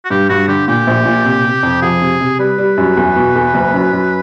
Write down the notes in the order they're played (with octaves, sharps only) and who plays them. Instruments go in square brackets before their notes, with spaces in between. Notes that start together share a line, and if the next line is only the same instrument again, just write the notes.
[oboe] F#4
[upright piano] G2 [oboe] G4
[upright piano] G2 [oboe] F#4
[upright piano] D3 [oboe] G4
[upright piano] A#2 [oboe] G4
[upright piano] A#1
A#2
C3
C3
F2
[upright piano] F3 [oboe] G#4
[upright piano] C3
C3
[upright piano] G3 [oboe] B4
[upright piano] G3
F#2
E2
B2
E2
F#1
F#2
F#2